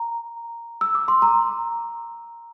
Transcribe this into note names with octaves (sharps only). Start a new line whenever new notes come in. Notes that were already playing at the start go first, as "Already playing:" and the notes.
Already playing: A#5
E6
D6
C6
A#5